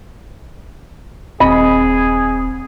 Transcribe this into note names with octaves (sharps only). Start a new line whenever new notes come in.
D#1 C4 G#4 D#5 B5